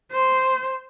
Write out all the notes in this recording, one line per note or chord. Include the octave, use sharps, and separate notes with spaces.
C5